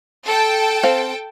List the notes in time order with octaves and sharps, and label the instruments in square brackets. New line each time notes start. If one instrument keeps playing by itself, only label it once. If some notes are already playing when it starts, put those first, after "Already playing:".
[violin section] A4 G5 A5
[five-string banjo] C4 F5